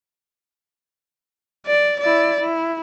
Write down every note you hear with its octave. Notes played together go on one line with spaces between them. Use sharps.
D5
E4 D5
E4